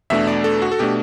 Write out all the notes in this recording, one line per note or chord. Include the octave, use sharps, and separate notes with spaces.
E2 B2 A3 D4 E5
D5
A4
F#4
A4
B2 A3 D4 G4